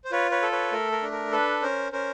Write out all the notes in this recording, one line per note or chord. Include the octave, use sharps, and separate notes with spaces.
C5
F4 B4 C#5
B4 C#5
A4
B4 C#5
A3 A#4
A#4
D4
A#4
A4 B4
C#4 A#4 C5
C#4 A#4 C5